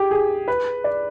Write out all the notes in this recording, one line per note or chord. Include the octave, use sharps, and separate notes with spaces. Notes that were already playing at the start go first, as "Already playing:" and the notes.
Already playing: G4 G#4
G#4
B4
D5